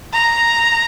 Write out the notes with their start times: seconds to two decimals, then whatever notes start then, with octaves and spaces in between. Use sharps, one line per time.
0.13 A#5